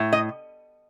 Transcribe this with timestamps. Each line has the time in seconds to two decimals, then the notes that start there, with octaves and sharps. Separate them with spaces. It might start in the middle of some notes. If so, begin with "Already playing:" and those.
Already playing: A2
0.13 D#5